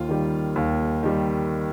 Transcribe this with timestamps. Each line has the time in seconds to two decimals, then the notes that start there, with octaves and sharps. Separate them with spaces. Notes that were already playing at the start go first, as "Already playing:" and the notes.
Already playing: D#2 F4
0.09 D#3 G3
0.56 D#2
1.03 D#3 G3